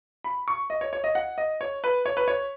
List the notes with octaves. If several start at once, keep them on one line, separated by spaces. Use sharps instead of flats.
B5
C#6
D#5
C#5
C#5
D#5
F#5
D#5
C#5
B4
C#5
B4
C#5